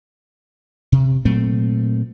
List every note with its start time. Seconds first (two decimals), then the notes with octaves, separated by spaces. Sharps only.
0.92 C3
1.25 A#2 F#3 A3 C4